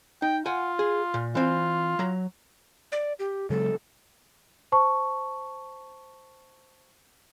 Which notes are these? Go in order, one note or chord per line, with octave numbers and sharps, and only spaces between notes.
D#4 G5
F4 F#5 G#5
G#4
A#2
E3 C4 F4
F#3 A#5
D5
G4
C#3 F#3 G#3 A4
C5 A5 C#6